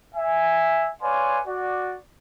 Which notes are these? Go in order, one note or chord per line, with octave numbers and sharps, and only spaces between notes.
E5 G#5
B4 C#5 D5 F5 G#5 C6
F#4 D5